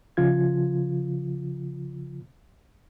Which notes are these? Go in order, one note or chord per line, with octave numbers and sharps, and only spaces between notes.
C#3 F3 F4 G#6